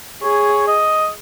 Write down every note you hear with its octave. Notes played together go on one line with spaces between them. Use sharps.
G#4 C#5
D#5